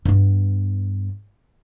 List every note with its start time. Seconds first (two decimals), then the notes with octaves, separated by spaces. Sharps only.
0.05 G2 B3